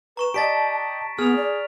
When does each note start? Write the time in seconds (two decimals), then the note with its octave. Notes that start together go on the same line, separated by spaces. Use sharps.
0.17 B4 A#5 C#6 E7
0.34 G4 D5 D#5 A5 A6 B6 D7
0.71 A5
1.19 B3 G#4 F6 F7
1.36 D5